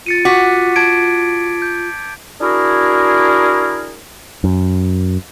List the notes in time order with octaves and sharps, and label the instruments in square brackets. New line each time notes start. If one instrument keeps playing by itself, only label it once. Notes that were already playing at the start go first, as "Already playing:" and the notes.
[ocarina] F4 [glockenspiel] A6 C#7 D#7
[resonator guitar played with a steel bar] F#4 [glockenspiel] D6 B6
[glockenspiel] A5 G#6 D7
G6
[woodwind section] D4 E4 F#4 G#4 A#4
[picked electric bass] F#2